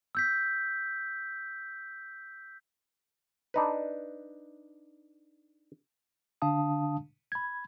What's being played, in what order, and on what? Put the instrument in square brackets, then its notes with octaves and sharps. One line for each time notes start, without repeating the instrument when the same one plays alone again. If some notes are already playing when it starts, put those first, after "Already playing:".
[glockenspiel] E6 G6 B6
[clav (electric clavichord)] D4 D#4 B4
[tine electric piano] D3 D4 F5 A5 D#6
B5 G#6